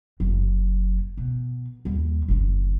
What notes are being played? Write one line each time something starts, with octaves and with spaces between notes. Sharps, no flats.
F#1 F#2
B2
D#2 G3
F#1 D3